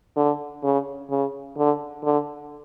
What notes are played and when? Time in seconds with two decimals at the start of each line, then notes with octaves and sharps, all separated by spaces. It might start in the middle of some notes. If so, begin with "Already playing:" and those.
0.16 D3
0.64 C#3
1.10 C#3
1.57 D3
2.04 D3